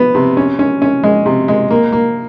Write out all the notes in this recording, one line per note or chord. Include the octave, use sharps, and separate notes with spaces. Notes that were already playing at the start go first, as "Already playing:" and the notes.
Already playing: B3
C3
C#4
C#4
C#4
G#3
C3
G#3
A#3
A#3